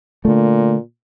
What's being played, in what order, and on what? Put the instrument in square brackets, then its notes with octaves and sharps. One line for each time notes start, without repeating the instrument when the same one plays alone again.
[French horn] A#2 [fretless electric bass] D3 A3